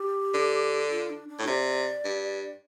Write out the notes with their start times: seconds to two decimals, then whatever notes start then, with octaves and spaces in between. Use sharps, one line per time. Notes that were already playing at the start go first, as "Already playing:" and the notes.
Already playing: G4
0.34 D3
0.91 F4
1.10 D4
1.29 D4
1.39 A2
1.47 C3 D5
2.04 G2